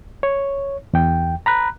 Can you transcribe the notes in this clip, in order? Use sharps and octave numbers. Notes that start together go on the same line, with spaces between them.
C#5
E2 G5
A#5 B5 F#6